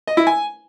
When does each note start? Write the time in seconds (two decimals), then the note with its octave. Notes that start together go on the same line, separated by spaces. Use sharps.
0.07 D#5
0.17 E4
0.27 G#5